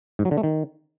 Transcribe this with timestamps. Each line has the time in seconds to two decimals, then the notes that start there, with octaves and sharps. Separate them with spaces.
0.19 G#2
0.25 F#3
0.31 D3
0.37 A3
0.43 D#3